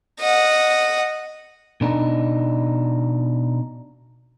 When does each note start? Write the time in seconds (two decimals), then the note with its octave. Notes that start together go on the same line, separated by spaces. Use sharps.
0.20 D#5 F#5
1.81 B2 D4 D#4